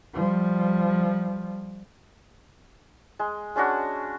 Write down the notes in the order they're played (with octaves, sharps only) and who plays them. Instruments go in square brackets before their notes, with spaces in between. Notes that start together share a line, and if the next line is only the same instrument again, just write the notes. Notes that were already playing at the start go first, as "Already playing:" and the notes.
[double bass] F3 G3
[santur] G#3
G#3 C#4 D4 F#4